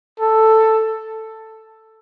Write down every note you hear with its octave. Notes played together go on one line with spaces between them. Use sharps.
A4